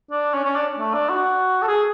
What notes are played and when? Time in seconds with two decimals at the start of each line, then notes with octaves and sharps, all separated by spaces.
0.11 D4
0.34 C#4
0.45 C#4
0.56 D4
0.78 A3
0.94 D4
1.09 F#4
1.62 A4
1.68 G#4